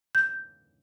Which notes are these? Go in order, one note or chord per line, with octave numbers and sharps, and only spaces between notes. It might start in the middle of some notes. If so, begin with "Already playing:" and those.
G6